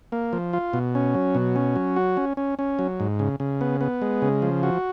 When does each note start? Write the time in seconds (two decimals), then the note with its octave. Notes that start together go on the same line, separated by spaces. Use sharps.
0.12 A#3
0.33 F3
0.53 F4
0.73 B2
0.95 C#4
1.15 F#3
1.35 B2
1.56 C#4
1.76 F#3
1.96 F#4
2.17 C#4
2.37 C#4
2.59 C#4
2.79 F#3
3.00 G#2
3.19 C#3
3.40 C#3
3.61 B3
3.81 B3
4.02 G#3
4.22 C#3
4.42 F3
4.63 F#4